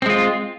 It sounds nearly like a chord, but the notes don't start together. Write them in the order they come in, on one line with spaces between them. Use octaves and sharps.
C4 G#3 F4